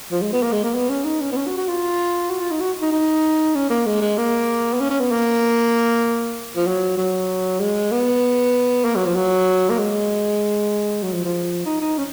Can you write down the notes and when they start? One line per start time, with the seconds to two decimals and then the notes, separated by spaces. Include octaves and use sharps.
0.11 F3
0.22 G#3
0.33 B3
0.43 A#3
0.52 G#3
0.64 A#3
0.74 B3
0.89 C#4
1.04 D#4
1.21 C#4
1.32 B3
1.36 C#4
1.47 F#4
1.57 F#4
1.68 F4
2.30 F#4
2.40 F4
2.51 D#4
2.60 F#4
2.82 D#4
2.92 D#4
3.55 C#4
3.70 A#3
3.86 G#3
4.01 G#3
4.18 A#3
4.74 B3
4.80 C#4
4.90 C#4
5.00 B3
5.11 A#3
6.56 F3
6.67 F#3
6.98 F#3
7.60 G#3
7.92 B3
8.85 A#3
8.95 F#3
9.06 F3
9.16 F#3
9.69 A#3
9.78 G#3
11.03 F#3
11.13 F3
11.25 F3
11.66 D#4
11.81 D#4
11.98 C#4